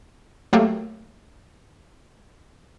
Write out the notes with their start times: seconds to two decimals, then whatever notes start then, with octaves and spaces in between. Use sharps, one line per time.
0.53 F#3 A3 A#3 G4